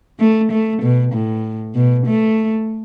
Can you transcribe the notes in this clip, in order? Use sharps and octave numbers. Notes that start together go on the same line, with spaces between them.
A3
A3
B2
A2
B2
A3